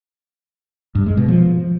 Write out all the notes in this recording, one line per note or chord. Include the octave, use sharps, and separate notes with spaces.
G2
G#3
B2
F3